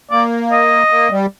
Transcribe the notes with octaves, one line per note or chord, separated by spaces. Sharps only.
A#3 D5
D#5
A#3
G3